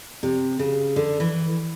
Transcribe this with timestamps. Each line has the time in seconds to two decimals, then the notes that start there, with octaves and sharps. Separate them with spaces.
0.23 C3
0.59 C#3
0.96 D3
1.20 E3